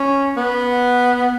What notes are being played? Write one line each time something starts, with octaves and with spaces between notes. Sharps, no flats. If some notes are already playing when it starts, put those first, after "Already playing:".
Already playing: C#4
B3